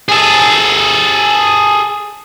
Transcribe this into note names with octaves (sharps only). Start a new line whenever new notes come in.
G#4 A4